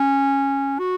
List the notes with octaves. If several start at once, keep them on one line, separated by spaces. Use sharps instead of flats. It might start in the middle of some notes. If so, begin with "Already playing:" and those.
Already playing: C#4
F#4